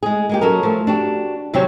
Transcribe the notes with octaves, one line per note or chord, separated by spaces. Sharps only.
G#3 G#4
G#3 A#3 G4
F#3 C#4 A4 A#4
F3 A3
D4 F#4 G4
E2 C3 F#3 C4 C#5 G5